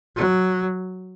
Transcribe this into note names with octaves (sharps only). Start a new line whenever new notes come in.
F#3